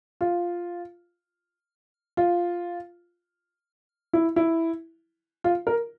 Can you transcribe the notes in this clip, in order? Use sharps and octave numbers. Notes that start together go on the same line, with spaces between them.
F4
F4
E4
E4
F4
A#4